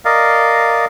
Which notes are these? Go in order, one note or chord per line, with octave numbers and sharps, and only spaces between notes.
A#4 D5 D#5 F5